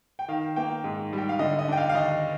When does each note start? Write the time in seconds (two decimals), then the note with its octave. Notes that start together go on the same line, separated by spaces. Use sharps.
0.19 G5
0.28 D#3 F5
0.56 A#3 G5
0.84 G#2
1.13 G3 G5
1.29 F5
1.39 D3 D#5
1.59 D#5
1.68 D4 G5
1.77 F5
1.89 F5
1.95 D#2 D#5